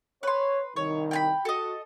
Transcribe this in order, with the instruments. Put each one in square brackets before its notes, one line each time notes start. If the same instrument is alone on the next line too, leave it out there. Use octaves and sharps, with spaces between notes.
[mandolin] B4 C6 [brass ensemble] C#5
[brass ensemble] C2 D#3 [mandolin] C#5
[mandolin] G5 G#5 B5
[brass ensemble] F#4 [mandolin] A4 D#5